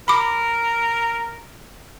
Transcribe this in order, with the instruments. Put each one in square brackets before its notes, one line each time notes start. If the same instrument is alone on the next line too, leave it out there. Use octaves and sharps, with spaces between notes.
[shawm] A#4 [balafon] B5 D6